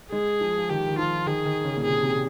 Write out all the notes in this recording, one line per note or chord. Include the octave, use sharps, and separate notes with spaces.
G#3 G#4
F3
F3
D#3 G4
D#3
F3 F4
D#3 G#4
D#3
C#3
A#2
C3 G#4
C3